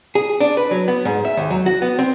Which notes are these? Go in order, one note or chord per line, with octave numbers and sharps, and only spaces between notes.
G#4
D4
B4
F#3
B3
G#2
E5
D#2
F#3
F#4
B3
C4